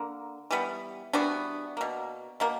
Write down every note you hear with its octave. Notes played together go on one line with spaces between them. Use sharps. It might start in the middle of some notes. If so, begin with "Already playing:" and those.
Already playing: D3 A#3
E3 G3 B3
E3 G3 B3 D4 F#4
B2 A#3
B2 A#3